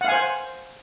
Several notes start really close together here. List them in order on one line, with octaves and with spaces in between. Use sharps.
F#5 F5 G#5 C5